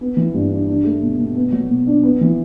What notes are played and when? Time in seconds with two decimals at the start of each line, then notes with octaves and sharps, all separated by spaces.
0.01 B3
0.17 E3
0.34 G2
0.52 D4
0.68 D4
0.85 A3
1.02 B2
1.19 B2
1.35 B3
1.52 F#3
1.70 B2
1.87 D4
2.03 B3
2.21 E3